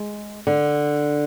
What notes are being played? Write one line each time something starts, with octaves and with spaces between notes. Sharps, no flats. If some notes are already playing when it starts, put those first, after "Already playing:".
Already playing: G#3
D3